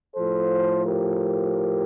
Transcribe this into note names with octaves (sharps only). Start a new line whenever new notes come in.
A2 F3 A4 C5
G4 A#4